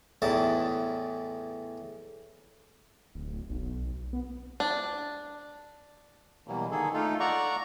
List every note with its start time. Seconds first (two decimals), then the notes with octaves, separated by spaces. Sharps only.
0.22 E2 A2 E3 D#4 A5
3.15 D1
3.50 B1
4.13 B3
4.60 D4
6.48 B2 E3 F#3 G3 A#3
6.71 D3 D#3 A#3 G#4 A4
6.94 A3 D#4 F4 A4
7.20 D5 F#5 A#5 C#6